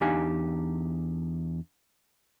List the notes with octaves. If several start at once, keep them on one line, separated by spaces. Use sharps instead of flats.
E2 D4 D#4 G4 F5 G#5